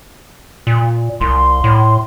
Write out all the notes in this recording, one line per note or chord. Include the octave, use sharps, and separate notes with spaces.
A#2
C2 C6
A2